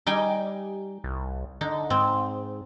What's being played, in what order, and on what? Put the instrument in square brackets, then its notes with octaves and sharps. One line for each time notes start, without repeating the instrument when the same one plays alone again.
[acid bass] G3 [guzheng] D#4 G5 G#5
[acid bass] C2
[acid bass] D3 [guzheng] D#4
[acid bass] G#2 [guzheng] C4